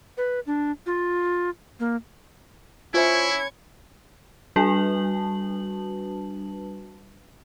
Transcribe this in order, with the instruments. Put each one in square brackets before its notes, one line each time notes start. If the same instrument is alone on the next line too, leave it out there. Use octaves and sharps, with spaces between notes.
[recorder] B4
D4
F4
A#3
[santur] C#4 B5 [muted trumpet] E4 [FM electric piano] F4 C5 E5 [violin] G#6 C#7
[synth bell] G3 D4 F#4 B4 A5 F#7